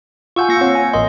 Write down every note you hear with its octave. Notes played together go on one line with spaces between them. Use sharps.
F4 F#5 G#5 C#6 E6 G6
A#3 A#6 C#7
C4 C#5 F#5
G#5
A1 A#4 D#5 C6